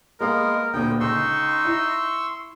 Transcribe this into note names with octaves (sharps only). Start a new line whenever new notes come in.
G#3 A#3 B3 A#4 F5
D2 A#2 B3 G5
C#2 D#4 C6 C#6 E6
E4